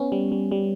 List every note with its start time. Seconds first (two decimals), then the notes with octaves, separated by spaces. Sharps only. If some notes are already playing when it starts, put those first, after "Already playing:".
Already playing: B3 C#4
0.12 G3
0.32 G3
0.51 G3